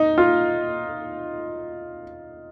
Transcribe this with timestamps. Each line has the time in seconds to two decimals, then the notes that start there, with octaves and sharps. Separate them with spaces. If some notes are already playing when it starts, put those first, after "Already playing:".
Already playing: D#4
0.18 F4